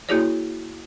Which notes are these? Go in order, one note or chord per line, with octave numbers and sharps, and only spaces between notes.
A#3 E4 F#4 G#4 C#5 D5